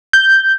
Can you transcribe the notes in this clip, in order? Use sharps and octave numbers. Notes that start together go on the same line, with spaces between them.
G6